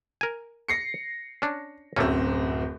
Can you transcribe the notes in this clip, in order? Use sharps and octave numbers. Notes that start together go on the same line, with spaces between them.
A#4 G#5
A#6 C7 C#7
C#4 D4
D1 F#2 A3 A#3 C4 C#4